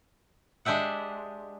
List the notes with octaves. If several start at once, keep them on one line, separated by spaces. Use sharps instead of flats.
G#3 D4 G4 E5 F#5